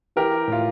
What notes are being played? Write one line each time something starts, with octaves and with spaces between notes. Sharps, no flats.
E3 G4 A#4
A2 F4